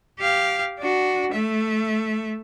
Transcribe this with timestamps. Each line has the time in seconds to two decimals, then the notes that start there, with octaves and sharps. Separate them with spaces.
0.19 G4 F5
0.79 D4 F#4
1.32 A3 E5